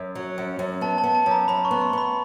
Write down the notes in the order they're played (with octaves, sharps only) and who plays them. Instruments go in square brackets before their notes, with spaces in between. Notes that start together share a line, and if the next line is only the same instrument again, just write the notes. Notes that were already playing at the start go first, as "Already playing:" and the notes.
Already playing: [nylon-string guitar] F#2
F#3
F#2
F#2
[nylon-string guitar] B3 [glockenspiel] A5
[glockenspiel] A5
[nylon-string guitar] B3
[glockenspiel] A5
[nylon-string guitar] F#2
[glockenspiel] A#5
[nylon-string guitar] F#2 [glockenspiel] B5
[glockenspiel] C#6
[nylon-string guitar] B3
[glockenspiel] C6
[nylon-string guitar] B3 [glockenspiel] B5